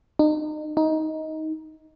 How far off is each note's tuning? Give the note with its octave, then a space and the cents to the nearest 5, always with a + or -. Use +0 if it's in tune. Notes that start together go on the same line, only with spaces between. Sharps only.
D#4 -35
D#4 +15